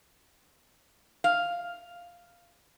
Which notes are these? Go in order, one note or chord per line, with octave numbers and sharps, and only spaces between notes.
F5